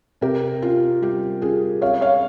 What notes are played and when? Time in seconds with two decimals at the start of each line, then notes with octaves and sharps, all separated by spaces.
0.21 C3 G4 A#4
0.62 C#4 F4
1.02 G3 G4
1.42 C#4 F4 G#4
1.82 C4 C#5 F5
2.01 C#5 F5